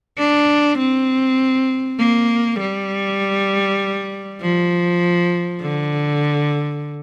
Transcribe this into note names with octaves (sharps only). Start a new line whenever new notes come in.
D4
C4
A#3
G3
F3
D3